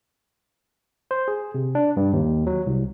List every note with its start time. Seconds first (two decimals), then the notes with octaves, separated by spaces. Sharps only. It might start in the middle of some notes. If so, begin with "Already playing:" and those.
1.11 C5
1.28 G#4
1.54 C3
1.75 D4
1.97 G2
2.13 D#2
2.47 F#3
2.66 C2